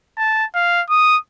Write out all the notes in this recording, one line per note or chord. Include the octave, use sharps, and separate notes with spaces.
A5
F5
D#6